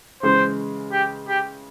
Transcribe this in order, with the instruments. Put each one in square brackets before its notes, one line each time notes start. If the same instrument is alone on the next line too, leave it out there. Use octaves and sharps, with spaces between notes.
[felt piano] C#3 E3 G#3 [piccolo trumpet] C5
[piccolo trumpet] G4
G4